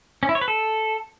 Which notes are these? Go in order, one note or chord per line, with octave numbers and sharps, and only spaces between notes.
C#4
E4
C#5
B4
A4